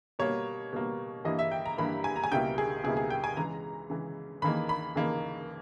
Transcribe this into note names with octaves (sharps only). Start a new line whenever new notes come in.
B2 G3 A#3 C#5
B2 G3 A#3
G2 E3 G3 A#3 E4 D#5
E5
G5
A#5
G2 E3 G3 A#3 E4 B5
G#5
A#5
G#5
C#2 B2 G3 A#3 E4 G5
G#4
C#2 B2 G3 A#3 E4 G#4
G#4
G5
G#5
C#3 E3 G#3 A#5
C#3 E3 G#3
D#2 C#3 E3 A#3 D#4 B5
B5
D#2 C#3 E3 A#3 D#4